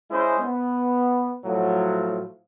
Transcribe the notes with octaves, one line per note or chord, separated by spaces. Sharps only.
G#3 C#4 E4 C5 D#5
B3
A2 F3 F#3